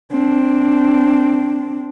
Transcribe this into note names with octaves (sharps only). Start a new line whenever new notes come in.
C4 D4